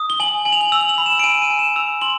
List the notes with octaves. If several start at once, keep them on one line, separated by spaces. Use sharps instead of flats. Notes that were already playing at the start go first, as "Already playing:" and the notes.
Already playing: D#6
G7
G#5 F#7
G#5 F#7
F7
F#7
E6 F7
F#7
F7
B5
E7
D7
G#5 D#7
D#7
G#5
E7
E6 F7
C6 F#7